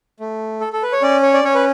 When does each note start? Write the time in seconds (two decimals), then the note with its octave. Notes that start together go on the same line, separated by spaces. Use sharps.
0.20 A3
0.61 A4
0.73 A4
0.83 B4
0.93 C#5
1.02 C#4 D5
1.23 C#5
1.34 D5
1.44 C#4 C#5
1.55 B4